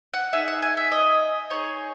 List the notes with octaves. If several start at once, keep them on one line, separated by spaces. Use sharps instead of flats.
F#5
D#4 G#4 E5
F#5
G#5
E5
D#5
D#4 G#4 C#5